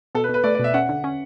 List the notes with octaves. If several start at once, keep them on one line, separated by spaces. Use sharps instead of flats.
B2 A4
B4
B2
B4
A3 D5
D5
B2
E5
C#4 F#5
D3
C#4